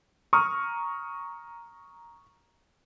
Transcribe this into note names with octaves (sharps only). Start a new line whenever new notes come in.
A#5 C#6 D#6 F6